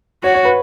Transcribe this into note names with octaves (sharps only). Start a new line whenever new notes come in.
F#4 C#5
C#5
B4